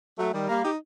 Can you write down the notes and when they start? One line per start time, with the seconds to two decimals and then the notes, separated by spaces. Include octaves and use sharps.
0.18 F#3 A3
0.33 D#3 G3
0.48 G3 A#3
0.63 D#4 G4